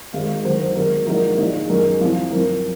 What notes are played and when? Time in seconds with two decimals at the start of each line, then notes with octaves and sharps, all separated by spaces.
0.13 G#1 G#2 D#3 F5
0.44 F#1 F#2 D#3 F#3 C5
0.60 C5
0.75 G#1 G#2 F#3 A#4
1.07 A#1 G#2 F#3 A#3 D#4 A#4
1.38 A#1 A#2 G#3 D#4
1.70 F#2 D#3 G#3 C#4 A#4
2.01 C2 C3 F3
2.31 F#2 F3 C4 A#4